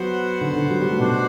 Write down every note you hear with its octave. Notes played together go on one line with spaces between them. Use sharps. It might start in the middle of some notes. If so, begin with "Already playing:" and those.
Already playing: F#3 B3 F#4 C5 F#5
D3
D3
F#3
G3
A3
B2 D4 F#4 C5